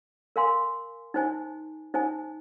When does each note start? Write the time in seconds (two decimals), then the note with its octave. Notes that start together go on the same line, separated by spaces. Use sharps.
0.36 A#4 F5 G#5 C6
1.14 D#4 C5 G#5
1.94 D#4 C5 G#5